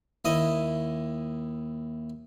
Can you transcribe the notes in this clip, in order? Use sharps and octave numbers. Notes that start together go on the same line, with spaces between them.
D#2 E4 D#5 D#6